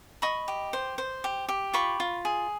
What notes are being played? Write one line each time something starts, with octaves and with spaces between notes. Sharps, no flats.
D#5 B5 C#6
G4
C5
C5
G4
G4
F4 B5 C#6
F4
G#4